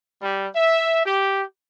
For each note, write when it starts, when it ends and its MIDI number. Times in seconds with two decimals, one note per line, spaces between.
0.21 0.47 55
0.55 1.00 76
1.06 1.43 67